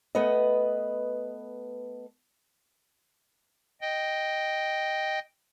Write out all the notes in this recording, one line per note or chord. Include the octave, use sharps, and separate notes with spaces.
A3 B3 B4 D#5
D#5 G5